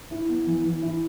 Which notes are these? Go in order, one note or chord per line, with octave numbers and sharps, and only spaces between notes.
E4
B3
E3
E3
E4